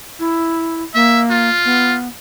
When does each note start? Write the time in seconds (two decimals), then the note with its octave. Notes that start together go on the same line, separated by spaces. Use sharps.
0.19 E4
0.95 A#3 E5
1.30 F4
1.65 B3